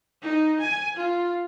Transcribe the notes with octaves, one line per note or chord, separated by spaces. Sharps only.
D#4
G#5
F4